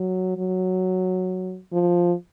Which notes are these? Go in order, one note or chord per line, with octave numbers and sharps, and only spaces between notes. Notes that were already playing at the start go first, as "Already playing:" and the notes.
Already playing: F#3
F#3
F3